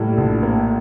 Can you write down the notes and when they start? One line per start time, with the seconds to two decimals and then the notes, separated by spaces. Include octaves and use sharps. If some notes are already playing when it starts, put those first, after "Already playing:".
Already playing: A2 G3 A#3
0.17 A#1
0.43 A#3